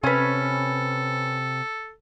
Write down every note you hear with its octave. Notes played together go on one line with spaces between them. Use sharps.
C3 C#4 A4 B4